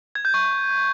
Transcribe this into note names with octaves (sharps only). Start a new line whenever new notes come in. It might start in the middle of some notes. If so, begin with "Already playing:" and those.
G#6
G6
C#6